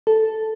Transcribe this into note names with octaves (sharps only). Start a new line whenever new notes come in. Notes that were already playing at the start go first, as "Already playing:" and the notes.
A4